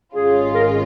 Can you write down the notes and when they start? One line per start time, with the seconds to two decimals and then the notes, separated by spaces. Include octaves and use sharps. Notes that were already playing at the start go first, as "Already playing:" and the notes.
0.15 G#1 G#2 G#3 C#4 F4 G#4
0.46 G#4
0.55 A#4
0.65 G#4